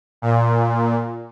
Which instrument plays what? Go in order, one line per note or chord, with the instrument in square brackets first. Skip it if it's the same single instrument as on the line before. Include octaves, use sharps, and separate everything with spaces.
[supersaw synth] A#2